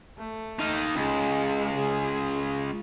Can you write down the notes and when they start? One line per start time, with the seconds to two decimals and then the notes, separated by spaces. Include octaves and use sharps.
0.18 A3
0.59 D#4 F5
0.96 C#2 G#3
1.74 G#4